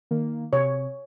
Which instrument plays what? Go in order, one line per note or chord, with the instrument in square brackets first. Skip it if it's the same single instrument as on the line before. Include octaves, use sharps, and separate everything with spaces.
[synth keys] D#3 A#3
[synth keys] C3 [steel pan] C#5